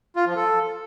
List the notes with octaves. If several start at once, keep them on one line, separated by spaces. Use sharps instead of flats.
F4
F3
A4